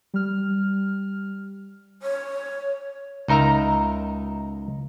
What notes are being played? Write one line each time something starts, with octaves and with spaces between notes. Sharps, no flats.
G3 F6
C#5
C#2 D#4 A#4 E5 A#5